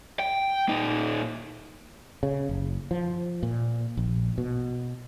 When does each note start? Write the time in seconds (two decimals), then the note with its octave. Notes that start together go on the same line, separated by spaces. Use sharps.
0.20 G5
0.69 A#2 D#4
2.23 C#3
2.49 F#1
2.91 F3
3.43 A#2
3.97 A#1
4.38 B2